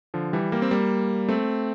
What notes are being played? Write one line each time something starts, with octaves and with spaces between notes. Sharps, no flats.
D3 F3
E3 G3
G3 A#3
C4
G3 A#3
A3 C4